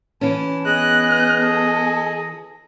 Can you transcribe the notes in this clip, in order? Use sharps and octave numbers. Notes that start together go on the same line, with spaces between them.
E3 C#4 A5
B3 G#4 D#5 F#6
A4